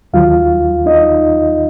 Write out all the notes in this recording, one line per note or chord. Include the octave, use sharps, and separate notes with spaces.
D#2 D#3 F#3 F4 F5
D#4 D#5